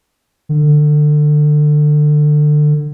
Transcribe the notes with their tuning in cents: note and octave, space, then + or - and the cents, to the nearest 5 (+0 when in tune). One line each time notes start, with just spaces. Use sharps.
D3 +25